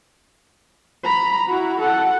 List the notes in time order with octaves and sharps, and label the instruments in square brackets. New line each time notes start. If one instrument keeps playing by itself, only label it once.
[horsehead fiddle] A#5 B5
E4 F#4
A4 F#5